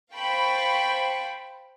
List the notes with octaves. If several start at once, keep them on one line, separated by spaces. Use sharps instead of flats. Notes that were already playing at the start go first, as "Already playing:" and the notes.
C5 F5 G5 A5 B5 C#6